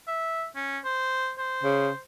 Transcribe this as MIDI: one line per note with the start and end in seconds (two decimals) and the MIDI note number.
0.07 0.45 76
0.56 0.79 61
0.85 1.32 72
1.38 1.99 72
1.63 1.90 49